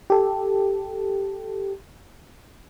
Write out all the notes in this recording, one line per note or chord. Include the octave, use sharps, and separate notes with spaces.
G4 A4